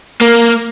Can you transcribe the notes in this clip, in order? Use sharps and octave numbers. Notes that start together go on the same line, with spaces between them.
A#3